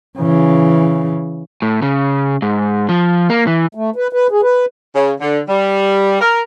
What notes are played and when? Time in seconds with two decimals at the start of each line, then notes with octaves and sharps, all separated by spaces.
0.19 C#3 E3
1.62 A2
1.82 C#3
2.42 G#2
2.89 F3
3.30 A#3
3.47 E3
3.75 A3
3.96 B4
4.13 B4
4.31 G#4
4.43 B4
4.95 C#3
5.21 D3
5.48 G3
6.21 A#4